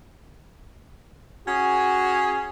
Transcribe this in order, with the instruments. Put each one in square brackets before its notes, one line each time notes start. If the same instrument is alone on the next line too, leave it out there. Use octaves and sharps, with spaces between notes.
[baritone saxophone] C#4 [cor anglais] F#4 [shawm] G#4